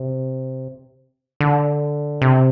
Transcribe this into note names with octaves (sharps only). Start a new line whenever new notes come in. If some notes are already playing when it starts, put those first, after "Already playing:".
Already playing: C3
D3
C3